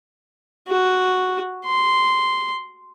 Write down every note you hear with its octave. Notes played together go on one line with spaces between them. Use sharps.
F#4
C6